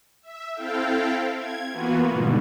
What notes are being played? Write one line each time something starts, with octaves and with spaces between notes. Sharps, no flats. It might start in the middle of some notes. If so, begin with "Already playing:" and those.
E5
C4 E4 A4 F5 G5
G#6
E3 A#3 B3 F4 F#4 B4
G#2 B2 D3 D#3 G3